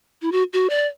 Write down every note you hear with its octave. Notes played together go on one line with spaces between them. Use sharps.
E4
F#4
F#4
D5